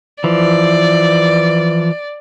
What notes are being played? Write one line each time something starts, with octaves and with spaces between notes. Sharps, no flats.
E3 F3 D5